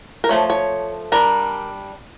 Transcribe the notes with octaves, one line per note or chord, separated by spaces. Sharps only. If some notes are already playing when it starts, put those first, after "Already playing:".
A#4
F3 A3 C#5
C#5
G3 D4 A#4